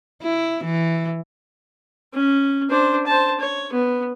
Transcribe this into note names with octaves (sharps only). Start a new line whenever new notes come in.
E4
E3
C#4
D4 C5
C5 A5
C#5
B3